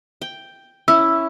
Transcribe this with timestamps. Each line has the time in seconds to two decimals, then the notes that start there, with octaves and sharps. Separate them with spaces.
0.22 G5
0.88 C#4 E4 E6